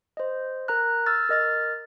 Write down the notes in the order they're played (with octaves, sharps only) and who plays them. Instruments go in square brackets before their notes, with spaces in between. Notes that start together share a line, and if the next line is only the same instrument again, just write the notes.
[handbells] C5 D#5
A#4 A#5 F#6
E6 F6 A6
A#4 D#5 F6 A6